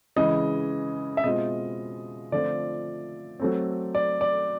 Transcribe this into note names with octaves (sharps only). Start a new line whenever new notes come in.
C#3 E3 G#3 D#5
E5
B2 G#3 C4 F4 D#5
D3 F3 A3 C4 F4 D5
F#3 A3 C4
D5
D5